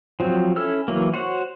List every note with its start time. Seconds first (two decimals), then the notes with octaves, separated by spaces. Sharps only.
0.20 F3 F#3 C4
0.56 C#4 E4 A4 E6 F6
0.88 E3 F#3 A#3
1.14 F#4 C5 C#5 F#5